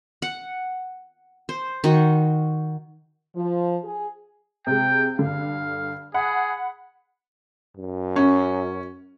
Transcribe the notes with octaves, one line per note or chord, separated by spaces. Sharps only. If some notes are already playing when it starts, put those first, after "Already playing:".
F#5
C5
D#3 F#4
F3
G#4
C3 G#3 G5
G2 D3 F5
G#4 F#5 B5
F#2
C#4